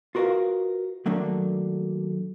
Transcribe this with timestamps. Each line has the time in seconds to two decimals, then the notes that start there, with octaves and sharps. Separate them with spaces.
0.15 F4 F#4 A#4 B4 D#5 F5
1.06 D#3 F#3 A3 A#3 D4